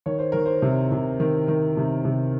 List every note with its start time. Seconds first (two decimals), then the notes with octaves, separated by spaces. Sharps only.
0.06 D#3 C#5
0.19 C5
0.32 D#3 A#4
0.46 C5
0.62 C3
0.92 C3
1.20 D#3
1.48 D#3
1.77 C3
2.05 C3